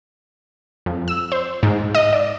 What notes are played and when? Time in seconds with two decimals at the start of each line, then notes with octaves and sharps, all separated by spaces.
0.86 F2
1.08 E6
1.32 C5
1.63 G#2
1.95 D#5
2.13 D5